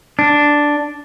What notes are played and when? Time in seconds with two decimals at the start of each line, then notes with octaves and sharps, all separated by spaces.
0.19 D4